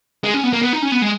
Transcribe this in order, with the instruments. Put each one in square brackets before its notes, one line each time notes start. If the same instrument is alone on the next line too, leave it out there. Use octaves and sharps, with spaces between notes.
[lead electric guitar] G#3
C#4
B3
A#3
B3
D#4
C#4
B3
G#3